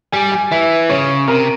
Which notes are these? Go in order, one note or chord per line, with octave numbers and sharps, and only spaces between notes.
G3 G#5
G#5
E3 E5
C#3 C#5
C3 A#4